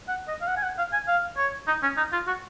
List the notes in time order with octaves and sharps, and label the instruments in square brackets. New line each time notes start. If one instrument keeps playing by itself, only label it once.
[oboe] F#5
D#5
F5
F#5
G#5
F#5
F5
G#5
F5
C#5
D#4
C#4
D#4
F4
F#4